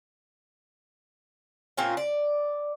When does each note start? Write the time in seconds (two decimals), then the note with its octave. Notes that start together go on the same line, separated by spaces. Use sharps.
1.77 A#2 C4 C#4 F4
1.97 D5